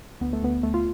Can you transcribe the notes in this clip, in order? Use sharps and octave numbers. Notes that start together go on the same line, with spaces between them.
D2 B3
A3
D2 B3
D2 A3
F4